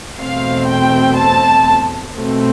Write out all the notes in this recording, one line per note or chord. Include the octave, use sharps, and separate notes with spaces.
E2 B2 A3 C4 F5
G5
A5
B2 A3 C4